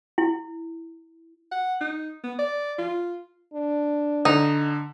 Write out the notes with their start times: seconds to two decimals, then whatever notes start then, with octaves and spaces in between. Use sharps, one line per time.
0.18 E4
1.52 F#5
1.81 D#4
2.23 B3
2.39 D5
2.79 F4
3.54 D4
4.25 D3 D#4